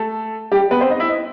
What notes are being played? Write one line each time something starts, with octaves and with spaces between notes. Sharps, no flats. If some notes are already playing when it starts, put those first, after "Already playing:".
Already playing: A3 A4
G3 G4
B3 B4
C4 C5
D#4 D#5
E4 E5
D#5